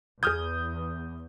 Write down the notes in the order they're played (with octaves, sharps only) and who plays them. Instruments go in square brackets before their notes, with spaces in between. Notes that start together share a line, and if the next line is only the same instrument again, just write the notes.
[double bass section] E2 [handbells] G#4 F6 G#6 [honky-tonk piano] D#6 G6